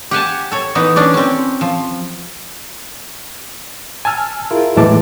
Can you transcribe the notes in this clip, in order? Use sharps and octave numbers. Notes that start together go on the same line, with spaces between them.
G4 F#5 G#5 A5
A4 C#5
E3 B3 D#4 E4
C#4 D4 D5
C4 C#4
F3
G#5 A5 E6 F6
E4 F4 G#4 A#4
D#2 A2 E3 G#3 A5 D6